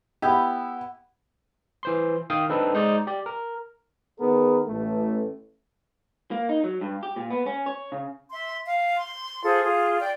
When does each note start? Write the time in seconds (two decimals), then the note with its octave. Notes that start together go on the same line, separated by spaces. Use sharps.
0.22 B3 E4 G4
1.83 E3 C5 C6
2.30 D#3 F5 G5 D#6
2.49 C4 D4 D#4 A4 B4
2.74 G#3 D#4 C5 D5
3.07 G4 D5
3.26 A#4
4.20 D#3 B3 G#4 A#4
4.68 A1 A3
6.31 A#3
6.49 D#4
6.64 F#3
6.81 G2
7.03 G4
7.16 A#2
7.30 B3
7.46 C#4
7.66 C#5
7.92 C#3
8.30 E5 C6
8.67 F5
8.96 C6
9.43 F4 G#4 A4 C5
9.64 F4 G#4
10.01 D5 G5